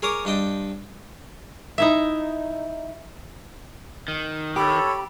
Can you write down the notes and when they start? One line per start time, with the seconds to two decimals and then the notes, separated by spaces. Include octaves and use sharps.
0.02 G#4 A#4 C#5 D6 D#6
0.25 G2 D4 D#5 G5
1.78 D#4 E4 E5
4.08 D#3
4.56 G4 A4 C#5 B5